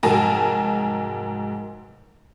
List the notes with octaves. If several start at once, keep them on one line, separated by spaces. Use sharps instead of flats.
F1 G#2 F#3 A#4 G#5 A5